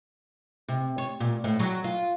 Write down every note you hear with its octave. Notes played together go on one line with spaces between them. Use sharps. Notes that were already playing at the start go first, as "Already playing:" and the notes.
C3
C#5
A#2
A2
F#3
F4